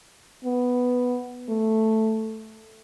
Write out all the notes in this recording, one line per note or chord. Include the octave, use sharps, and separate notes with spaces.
B3
A3